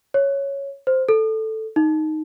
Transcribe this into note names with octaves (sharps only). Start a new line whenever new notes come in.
C#5
C5
A4
D#4